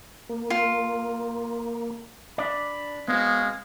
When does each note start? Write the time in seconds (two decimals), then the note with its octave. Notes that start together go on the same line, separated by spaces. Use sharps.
0.30 A#3
0.50 F4
2.38 D4 D5 B5
3.08 G#3 B3 C4 F#4 F5